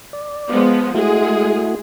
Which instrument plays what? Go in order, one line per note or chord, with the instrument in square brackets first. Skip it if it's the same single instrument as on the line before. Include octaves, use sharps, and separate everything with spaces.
[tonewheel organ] D5
[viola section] F3 G#3 B3
[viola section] G#3 G#4 [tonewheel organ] A3 E4 F#4